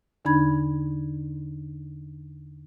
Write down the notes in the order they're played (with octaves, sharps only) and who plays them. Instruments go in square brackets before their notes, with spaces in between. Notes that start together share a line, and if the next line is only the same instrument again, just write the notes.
[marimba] E2 D3 D4 D#4 B5 G#6